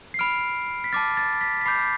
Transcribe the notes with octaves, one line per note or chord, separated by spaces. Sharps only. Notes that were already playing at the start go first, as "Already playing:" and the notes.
C7
B5 F6 D7
B6
A5 D6 F6 A6
A6
B6
B6
B5 D6 G6 C7